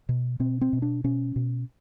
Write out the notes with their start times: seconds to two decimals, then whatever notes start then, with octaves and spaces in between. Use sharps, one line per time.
0.09 B2
0.40 B2 C4
0.61 C4
0.73 B2
0.82 D4
1.04 B2 C#4
1.36 B2